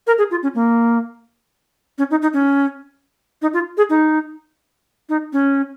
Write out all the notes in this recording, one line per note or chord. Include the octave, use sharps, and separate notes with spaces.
A#4
G#4
F4
C#4
A#3
C#4
D#4
D#4
C#4
D#4
F4
G#4
D#4
D#4
C#4